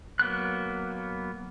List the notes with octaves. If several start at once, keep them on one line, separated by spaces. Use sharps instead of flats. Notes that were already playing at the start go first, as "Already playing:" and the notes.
F#3 A#3 B3 F#6